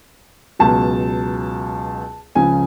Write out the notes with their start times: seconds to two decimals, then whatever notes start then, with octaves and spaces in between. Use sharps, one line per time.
0.59 C#2 B2 F#3 A5
2.35 C#2 C#3 F3 G#5